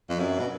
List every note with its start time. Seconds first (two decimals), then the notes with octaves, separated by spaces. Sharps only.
0.09 F2
0.19 F#2
0.39 B2